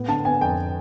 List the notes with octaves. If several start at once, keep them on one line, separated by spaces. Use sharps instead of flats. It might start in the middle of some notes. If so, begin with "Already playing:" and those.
Already playing: A2 B3
D3 A5
B3 G#5
F2 G5